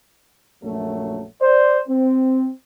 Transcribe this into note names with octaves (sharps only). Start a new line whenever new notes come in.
A#1 F#2 F#3 A3
C5 D5
C4